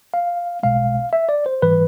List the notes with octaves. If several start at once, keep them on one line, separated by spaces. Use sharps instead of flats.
F5
B1 B2 G#3 F5
E5
D5
C5
G#2 E3 G3 B4